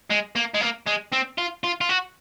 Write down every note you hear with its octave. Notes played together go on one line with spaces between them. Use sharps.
G#3
A#3
G#3
A#3
G#3
C4
F4
F4
F4
F#4